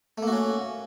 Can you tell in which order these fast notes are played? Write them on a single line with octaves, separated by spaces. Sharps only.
A3 A#3 F#4 C#4